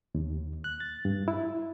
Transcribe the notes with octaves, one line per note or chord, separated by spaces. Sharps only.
D#2
F#6
A6
G2
E4